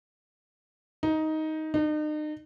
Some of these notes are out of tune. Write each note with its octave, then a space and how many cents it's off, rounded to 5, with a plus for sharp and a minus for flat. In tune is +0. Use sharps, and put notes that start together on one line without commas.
D#4 +10
D#4 -40